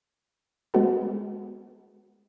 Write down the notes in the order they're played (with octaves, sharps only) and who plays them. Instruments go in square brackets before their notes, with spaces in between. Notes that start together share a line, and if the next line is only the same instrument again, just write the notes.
[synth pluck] G#3 B3 F#4 A4